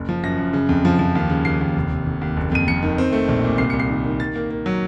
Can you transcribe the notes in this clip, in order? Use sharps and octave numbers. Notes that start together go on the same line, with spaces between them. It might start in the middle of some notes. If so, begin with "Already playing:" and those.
Already playing: F#1
F3
F#2 A#6
F#2
C#3
F2
F3
F3
D#2
C#3
D#2 C7
D#2
F1
F1
F1
D#2
F#1
F2 D#7
F2 C#7
D#3
C4
A3
A#1
A#2
C2 C7
C2 C#7
C7
D#3
D#3
A#3 A6
A#3
A#3
F#3